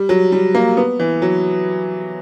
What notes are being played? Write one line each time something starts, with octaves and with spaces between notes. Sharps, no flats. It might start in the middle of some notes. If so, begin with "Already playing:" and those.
Already playing: G3
F#3
G3
A#3
B3
E3
F#3